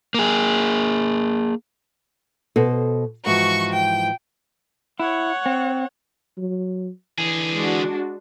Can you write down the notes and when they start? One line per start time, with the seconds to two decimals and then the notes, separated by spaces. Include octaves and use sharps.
0.14 A#3 G#4
2.56 B2 A4 C5
3.26 G#2 E3 F3 F#4 C#6
3.73 G5
5.00 E4 C#5 F#5
5.46 C4
6.38 F#3
7.18 D3 E3 G#4
7.55 G#3 D4 F#4